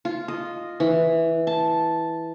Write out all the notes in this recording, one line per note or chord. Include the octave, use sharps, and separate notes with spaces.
F4
D#5
E3
A5